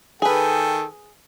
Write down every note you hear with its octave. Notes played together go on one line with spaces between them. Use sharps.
D#3 G#4 A4 B4 G5 G#5